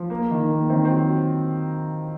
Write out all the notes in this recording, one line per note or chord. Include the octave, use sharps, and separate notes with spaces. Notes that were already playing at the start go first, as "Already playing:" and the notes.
Already playing: F3
A#3
D#3
A#3
D#3 C4 D#4
C4
F#3